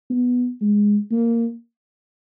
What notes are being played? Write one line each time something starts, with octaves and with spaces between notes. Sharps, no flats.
B3
G#3
A#3